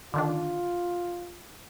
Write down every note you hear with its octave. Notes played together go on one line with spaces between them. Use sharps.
D3 D#3 D4 F4